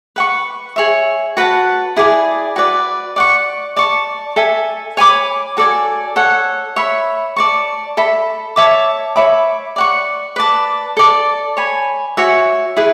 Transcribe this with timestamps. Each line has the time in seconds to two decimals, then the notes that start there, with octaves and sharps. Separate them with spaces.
0.16 B4 F#5 C#6
0.76 G#4 C#5 E5
1.37 F#4 B4 F#5 A5
1.97 E4 G#4 D5 G#5
2.56 F#4 B4 D5
3.16 D5 F#5 C#6
3.76 D5 A5 C#6
4.36 A4 E5 G#5
4.97 C#5 G#5 B5 D6
5.57 F#4 A4 D5 G#5
6.16 A4 C#5 F#5
6.76 C#5 E5 B5
7.36 D5 A5 C#6
7.97 A4 E5 B5
8.56 C#5 E5 A5 D6
9.16 C#5 E5 B5 D6
9.76 D5 F#5 C#6
10.36 B4 D5 A5 D6
10.97 A4 D5 A5
11.57 C#5 G#5 B5
12.17 F#4 C#5 E5 G#5
12.77 E4 G#4 B4